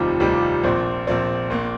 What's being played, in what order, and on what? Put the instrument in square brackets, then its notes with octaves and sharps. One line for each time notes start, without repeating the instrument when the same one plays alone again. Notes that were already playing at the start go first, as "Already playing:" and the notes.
Already playing: [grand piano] F1 D#2 D#3 G3 C4 [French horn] F4
[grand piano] F1 D#2 D#3 G3 C4
A#1 A#2 F3 C4
A#1 A#2 F3 C4
A#1 A#2 A#3